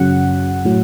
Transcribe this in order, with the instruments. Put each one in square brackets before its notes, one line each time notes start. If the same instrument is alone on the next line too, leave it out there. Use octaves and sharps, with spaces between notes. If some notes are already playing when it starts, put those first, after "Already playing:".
Already playing: [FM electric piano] F#2 C#3 F#3 F#5
A2 F#3